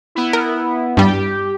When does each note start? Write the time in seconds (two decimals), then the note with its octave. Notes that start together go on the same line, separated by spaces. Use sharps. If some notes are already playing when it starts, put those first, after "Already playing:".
0.15 B3 E4
0.33 A#4
0.97 G2 G3 G4